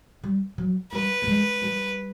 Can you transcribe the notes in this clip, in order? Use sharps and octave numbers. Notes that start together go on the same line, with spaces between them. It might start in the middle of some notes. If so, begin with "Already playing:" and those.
G3
F#3
G3 B4
A3
G#3
G3